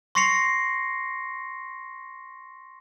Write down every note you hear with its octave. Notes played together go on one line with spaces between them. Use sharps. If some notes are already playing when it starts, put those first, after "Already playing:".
C6 C#6 A#6 C7 C#7 F7